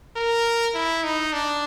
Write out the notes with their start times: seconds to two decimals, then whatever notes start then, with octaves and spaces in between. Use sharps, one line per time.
0.16 A#4
0.74 E4
1.04 D#4
1.33 D4